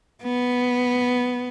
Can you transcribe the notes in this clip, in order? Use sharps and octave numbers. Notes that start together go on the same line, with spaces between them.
B3